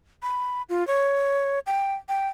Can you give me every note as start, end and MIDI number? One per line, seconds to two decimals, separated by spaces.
0.22 0.62 83
0.69 0.86 65
0.87 1.59 73
1.67 1.94 79
2.09 2.28 79